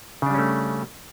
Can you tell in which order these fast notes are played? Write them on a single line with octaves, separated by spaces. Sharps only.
C#3 D4 G3 C#4 A3